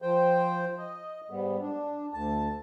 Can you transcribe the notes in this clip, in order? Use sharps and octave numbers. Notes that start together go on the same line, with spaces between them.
F3 C5 G5
D#5
G#2 G3 B3
D4
D2 A5